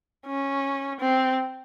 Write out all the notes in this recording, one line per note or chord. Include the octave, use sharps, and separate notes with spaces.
C#4
C4